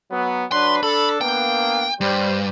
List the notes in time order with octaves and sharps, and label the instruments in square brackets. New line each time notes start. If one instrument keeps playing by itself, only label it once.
[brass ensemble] F#3 B3
[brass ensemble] F#3 D4 B4 [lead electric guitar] C6
[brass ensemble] D4 A4 [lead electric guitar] B5
[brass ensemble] A#3 B3 D4 [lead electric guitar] G5
[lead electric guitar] G2 [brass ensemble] G3 C5